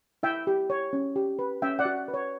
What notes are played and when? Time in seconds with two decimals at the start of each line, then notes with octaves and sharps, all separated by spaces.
0.23 E4 E5 G5
0.47 G4
0.70 C#5
0.93 C#4
1.16 G4
1.39 B4
1.62 C#4 E5 G5
1.79 D5 F#5
1.85 F#4
2.08 B4
2.14 C#5